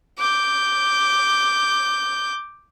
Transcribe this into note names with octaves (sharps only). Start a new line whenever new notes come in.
D6 G6